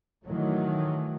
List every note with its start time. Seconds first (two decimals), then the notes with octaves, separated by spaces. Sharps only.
0.25 D#3 E3 F#3 A3